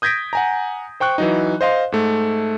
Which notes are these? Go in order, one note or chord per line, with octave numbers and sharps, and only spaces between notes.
D#6 G6 G#6 A#6 B6 D7
F#5 G#5 A#5
C5 G5 C#6 F#6
E3 F#3 D#4
C5 D#5 F5 C6
G#2 A3